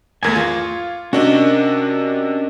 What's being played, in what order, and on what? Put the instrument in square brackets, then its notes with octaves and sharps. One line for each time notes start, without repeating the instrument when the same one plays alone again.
[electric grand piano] G#1 E2 G#6 [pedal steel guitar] A3 A#4 G#5
[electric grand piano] F4 [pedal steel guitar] C#6 D6
[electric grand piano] C3 D4 F#4 [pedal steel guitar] C#4 A#4 D#5